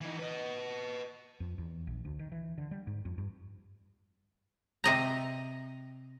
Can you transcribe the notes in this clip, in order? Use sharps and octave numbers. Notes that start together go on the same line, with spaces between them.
E3 D#4
B4 D#5
F2
E2
A#1
D2
D#3
E3
D3
G3
G#2
F2
G2
C3 D#5 A#5